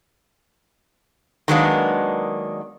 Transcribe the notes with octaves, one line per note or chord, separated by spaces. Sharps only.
D#3 F#3 G#3 A#3 B3 D4